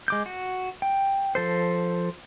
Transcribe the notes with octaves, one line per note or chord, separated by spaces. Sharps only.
G#3 D6 G6
F#4
G5
F3 A4 C5